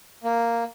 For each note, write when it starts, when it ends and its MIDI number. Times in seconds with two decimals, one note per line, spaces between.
0.24 0.64 58